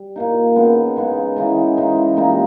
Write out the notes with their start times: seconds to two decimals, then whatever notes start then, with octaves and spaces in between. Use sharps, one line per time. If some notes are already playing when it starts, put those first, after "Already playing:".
Already playing: G3
0.16 A#2 A#3 D#4
0.55 C#3 G#3 B3 D#4
0.96 C#3 G#3 B3 D#4
1.36 C#3 E3 G#3 D#4
1.77 C#3 E3 G#3 D#4
2.16 A#2 G3 A#3 D#4